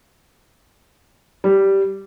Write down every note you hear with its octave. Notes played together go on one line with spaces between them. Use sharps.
G3